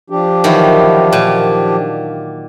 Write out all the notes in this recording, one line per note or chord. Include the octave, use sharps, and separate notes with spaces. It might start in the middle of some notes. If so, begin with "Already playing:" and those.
F3 D4 G4
D#3 E3 F#3
A#2